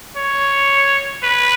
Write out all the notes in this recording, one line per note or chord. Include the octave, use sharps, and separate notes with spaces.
C#5
B4